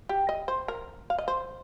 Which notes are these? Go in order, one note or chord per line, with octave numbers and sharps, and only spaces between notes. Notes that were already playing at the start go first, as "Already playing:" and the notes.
G4
D#5
C5
A#4
F5
D#5
C5